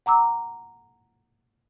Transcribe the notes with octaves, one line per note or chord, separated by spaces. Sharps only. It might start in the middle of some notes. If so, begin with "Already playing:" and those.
F#5 A#5 D6 E6